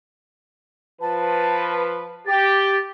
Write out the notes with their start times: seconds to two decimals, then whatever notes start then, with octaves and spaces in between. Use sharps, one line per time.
1.01 F3 B4 A5
2.27 G4 A6